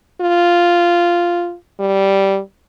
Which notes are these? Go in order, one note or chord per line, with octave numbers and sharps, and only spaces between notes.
F4
G3